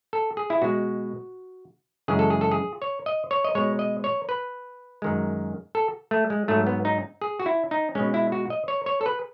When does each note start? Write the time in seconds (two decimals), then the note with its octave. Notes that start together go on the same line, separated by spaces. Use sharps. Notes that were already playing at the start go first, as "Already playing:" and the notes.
0.13 A4
0.37 G#4
0.50 E4
0.62 B2 G#3 F#4
2.08 F#2 C#3 E3 G#3 G#4
2.19 A4
2.30 G#4
2.41 A4
2.52 G#4
2.82 C#5
3.06 D#5
3.31 C#5
3.44 D#5
3.55 B2 G#3 C#5
3.79 D#5
4.04 C#5
4.29 B4
5.02 F#2 D#3 G#3
5.75 A4
6.11 A3
6.30 G#3
6.48 G#2 F#3 A3
6.67 B3
6.85 D#4
7.22 G#4
7.40 F#4
7.46 E4
7.71 D#4
7.95 B2 G#3 C#4
8.14 E4
8.32 F#4
8.50 D#5
8.68 C#5
8.86 C#5
9.01 A4
9.06 B4